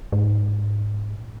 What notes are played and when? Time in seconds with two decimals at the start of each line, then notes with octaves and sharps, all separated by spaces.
0.12 G#2
1.15 A#2